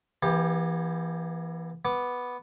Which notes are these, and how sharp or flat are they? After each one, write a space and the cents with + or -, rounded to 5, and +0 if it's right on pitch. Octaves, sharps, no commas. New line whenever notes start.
E3 +20 B3 -40 G4 +20
B3 +0 D6 +0